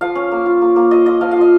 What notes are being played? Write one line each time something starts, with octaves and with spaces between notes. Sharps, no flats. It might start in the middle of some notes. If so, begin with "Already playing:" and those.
F3 F5
C#4
A#3
F4
A#3
A#3
F4 D#5
F4 D#5
F3 F5
F5
F4 D#5